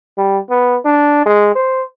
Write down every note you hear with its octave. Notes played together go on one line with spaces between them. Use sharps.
G3
B3
D4
G#3
C5